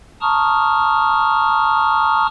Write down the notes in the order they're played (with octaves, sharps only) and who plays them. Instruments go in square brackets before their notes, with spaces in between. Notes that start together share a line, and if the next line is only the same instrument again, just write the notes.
[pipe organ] A5 A#5 C#6 D#6 F6